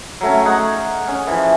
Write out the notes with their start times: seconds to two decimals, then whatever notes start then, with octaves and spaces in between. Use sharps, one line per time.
0.21 F#3 A3 C#4
0.45 D#4 G#4 F#5 C#6
1.08 C#4
1.27 E3 F3